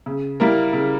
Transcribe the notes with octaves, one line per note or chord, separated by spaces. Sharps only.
C#3
G3 A#3 E4 A#4
C#3